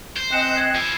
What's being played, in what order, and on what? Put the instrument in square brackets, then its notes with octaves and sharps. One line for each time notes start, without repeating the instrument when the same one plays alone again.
[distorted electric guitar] C5 [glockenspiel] G7
[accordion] C4 D#5 F#6 [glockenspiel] G#5 C#7 E7
[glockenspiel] G#6 C7
[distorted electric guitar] F3 E4